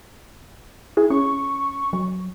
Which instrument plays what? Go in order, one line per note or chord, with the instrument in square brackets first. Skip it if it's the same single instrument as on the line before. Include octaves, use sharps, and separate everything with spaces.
[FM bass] E4 [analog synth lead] G#4
[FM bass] C#4 [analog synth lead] C#6
[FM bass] F#3